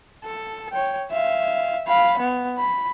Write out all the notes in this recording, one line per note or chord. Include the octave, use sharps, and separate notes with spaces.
A4
C#5 G5
E5 F5
F5 B5
B3
B5